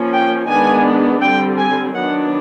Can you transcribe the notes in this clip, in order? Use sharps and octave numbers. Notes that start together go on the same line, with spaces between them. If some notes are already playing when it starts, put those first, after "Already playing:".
Already playing: F3 A#3 C#4
G5
D#3 G#3 B3 D4 G#5
D3 G3 C4 G5
G#5
D#3 F#3 B3 D4 F#5